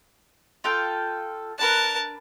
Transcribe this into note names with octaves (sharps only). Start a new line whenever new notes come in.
F4 A4 G5
D4 A#4 B4 A5